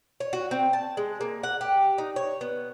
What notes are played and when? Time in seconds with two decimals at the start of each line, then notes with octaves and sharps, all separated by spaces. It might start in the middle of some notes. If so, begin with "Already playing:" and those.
0.20 C#5
0.33 F#4
0.51 C4
0.73 A5
0.97 G#3
1.21 A#3
1.43 F#5
1.61 G4
1.98 D#4
2.16 C#5
2.41 B3